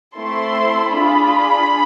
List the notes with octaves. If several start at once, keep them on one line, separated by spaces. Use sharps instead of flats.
A3 C4 E4 A4 C6
D4 F4 G#4 B5